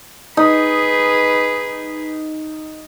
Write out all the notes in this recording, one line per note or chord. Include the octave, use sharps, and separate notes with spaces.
D#4 G#4 B4